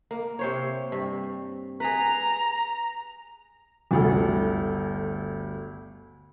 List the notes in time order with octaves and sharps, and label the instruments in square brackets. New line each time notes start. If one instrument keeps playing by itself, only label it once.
[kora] A#3
C3 C5 C#5
G2
[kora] G#4 B4 [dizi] A#5
[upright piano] G1 D2 A4